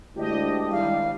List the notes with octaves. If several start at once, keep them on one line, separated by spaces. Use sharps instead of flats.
D2 G#3 D4 E4 G4 D#5
G#1 G3 F5